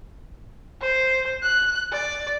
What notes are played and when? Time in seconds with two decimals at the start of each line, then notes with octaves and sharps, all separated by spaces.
0.82 C5
1.43 F#6
1.92 D5